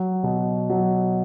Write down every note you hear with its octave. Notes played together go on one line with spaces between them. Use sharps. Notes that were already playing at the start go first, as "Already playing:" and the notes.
Already playing: F#3
B2
F#3